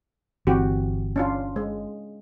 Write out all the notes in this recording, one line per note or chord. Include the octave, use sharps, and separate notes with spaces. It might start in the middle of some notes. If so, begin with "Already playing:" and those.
G1 E3 C4 F#4 G4
C#4 D4 F4
G#3